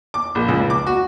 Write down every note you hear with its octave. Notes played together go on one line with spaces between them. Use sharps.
D6
A#1
C#2
D6
F#4